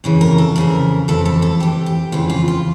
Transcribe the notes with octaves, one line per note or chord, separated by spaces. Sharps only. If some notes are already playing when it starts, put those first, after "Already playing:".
F2 C#3 E3
A#4
A4
F2 C#3 E3 A#4
F2 E3 A4
A4
A4
F2 E3 G4
G4
F2 C#3 E3 F4
F4
F4